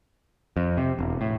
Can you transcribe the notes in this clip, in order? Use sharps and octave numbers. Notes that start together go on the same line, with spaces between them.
F2
C3
E1
A2